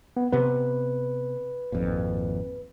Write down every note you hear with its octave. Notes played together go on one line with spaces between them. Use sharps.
B3
C3 B3 B4
G#1 F2 A#2